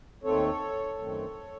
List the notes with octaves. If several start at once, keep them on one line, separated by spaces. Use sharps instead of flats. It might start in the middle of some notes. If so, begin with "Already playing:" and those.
D#2 D#3 A3 C4 A4 C#5
F#2 D#3 A3 C4